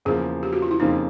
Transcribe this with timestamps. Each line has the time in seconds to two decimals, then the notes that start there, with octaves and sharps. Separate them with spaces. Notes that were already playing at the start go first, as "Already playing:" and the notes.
0.05 E2 C#3 F3 A#3 G#4
0.43 G4
0.53 F#4
0.62 F4
0.71 E4
0.80 F2 C#3 F3 A#3 D#4